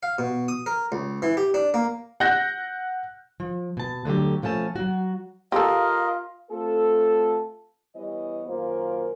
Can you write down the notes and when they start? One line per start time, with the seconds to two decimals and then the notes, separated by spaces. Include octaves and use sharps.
0.03 F5
0.19 B2
0.48 D#6
0.66 A#4
0.92 C#2
1.22 E3
1.37 G4
1.54 D4
1.74 A#3
2.20 F#5 F#6 G6 A#6
3.40 F3
3.77 B2 A5
4.05 D2 D3 F#3 G4
4.42 B2 F3 A3 C#4 A5
4.76 F#3 F#4
5.52 F4 G4 A4 A#4 D#5 F5
6.51 A3 C4 F4 A4
7.96 E3 G3 B3 C#5 D#5
8.48 F#2 D#3 A#3 F4 A#4 C5